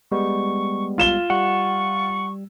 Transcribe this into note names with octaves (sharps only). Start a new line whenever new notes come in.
G3 G#3 B3 C#6
F4 E7 G7
G3 F#5 C#6